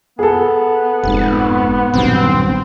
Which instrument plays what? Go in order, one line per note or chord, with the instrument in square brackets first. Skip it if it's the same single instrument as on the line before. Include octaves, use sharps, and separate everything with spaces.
[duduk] B3 [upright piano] G#4 A4
[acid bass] F1 [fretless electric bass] G#2 C3
[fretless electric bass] D#1 B1 G2 [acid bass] C4